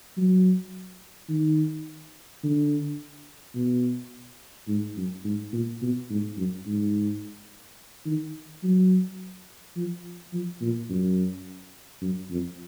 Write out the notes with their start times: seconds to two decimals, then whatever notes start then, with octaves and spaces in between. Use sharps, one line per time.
0.17 F#3
1.29 D#3
2.43 D3
3.55 B2
4.68 G#2
4.97 F#2
5.24 G#2
5.52 A#2
5.82 B2
6.10 G#2
6.37 F#2
6.66 G#2
8.06 D#3
8.63 F#3
9.76 F3
10.33 F3
10.61 A#2
10.90 F#2
12.02 F#2
12.30 F2